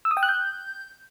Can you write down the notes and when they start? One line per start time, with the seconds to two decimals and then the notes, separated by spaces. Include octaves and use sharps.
0.05 E6
0.11 D#6
0.17 G5
0.23 F#6
0.29 G6